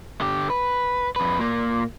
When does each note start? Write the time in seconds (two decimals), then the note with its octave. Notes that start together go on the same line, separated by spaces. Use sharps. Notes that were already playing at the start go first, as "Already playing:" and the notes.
0.21 D3 G4
0.50 B4
1.16 F2 B4
1.39 A#2 A#3